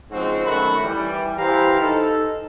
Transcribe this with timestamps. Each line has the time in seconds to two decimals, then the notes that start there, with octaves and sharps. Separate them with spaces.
0.11 G#2 C#3 F3 C4 F#4
0.45 F#2 D#3 A3 F#4 B5
0.82 E3 G3
1.37 E3 G4 C5 F5 A#5
1.80 D#4 A4